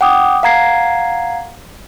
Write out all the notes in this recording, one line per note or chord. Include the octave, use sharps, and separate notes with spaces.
F#5 G5 D6 D#6
F5 F#5 A#5 G#6 C7